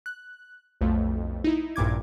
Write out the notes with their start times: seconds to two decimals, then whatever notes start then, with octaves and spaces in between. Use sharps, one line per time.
0.06 F#6
0.81 B1 F2 A3
1.44 D#4 E4
1.76 A#1 G2 A#2 D6 G#6